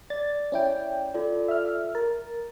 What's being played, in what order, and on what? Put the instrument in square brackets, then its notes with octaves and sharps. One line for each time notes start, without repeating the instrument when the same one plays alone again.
[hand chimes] D5 [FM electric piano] A6
[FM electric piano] C#4 E4 G5
[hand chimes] F4 A4 D5
[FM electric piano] E5 F6
[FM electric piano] A#4 [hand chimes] A6